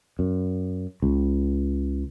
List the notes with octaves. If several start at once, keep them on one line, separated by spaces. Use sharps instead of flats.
F#2
C#2